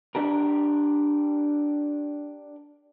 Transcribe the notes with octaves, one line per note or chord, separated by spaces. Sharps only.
D4 G4 A#4